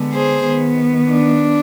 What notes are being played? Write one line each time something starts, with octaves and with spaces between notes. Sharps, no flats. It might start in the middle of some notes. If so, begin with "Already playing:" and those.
Already playing: D3 G#3 B3
G#4 C5
D#3 B3
D4